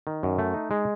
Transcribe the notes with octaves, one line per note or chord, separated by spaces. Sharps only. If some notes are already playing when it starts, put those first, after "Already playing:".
D#3
F#2
A3
D#4
G#3